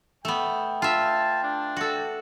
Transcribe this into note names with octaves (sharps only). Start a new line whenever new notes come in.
A3 B3 G5
F4 E5 A5
D4
F#4 A4